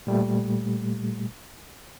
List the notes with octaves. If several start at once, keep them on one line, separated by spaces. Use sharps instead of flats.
A#2 G3 A3